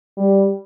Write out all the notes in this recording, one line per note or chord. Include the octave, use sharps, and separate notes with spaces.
G3